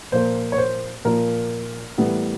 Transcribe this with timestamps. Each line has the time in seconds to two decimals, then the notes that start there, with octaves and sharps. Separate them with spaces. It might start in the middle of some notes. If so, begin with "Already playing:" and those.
0.12 A#2 F3 A#3 C5
0.52 C#5
0.58 C5
1.05 A#2 F3 A#3 A#4
1.98 A2 E3 G3 B3